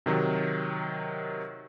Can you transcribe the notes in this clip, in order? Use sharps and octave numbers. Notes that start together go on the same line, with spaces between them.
C3 D#3 F#3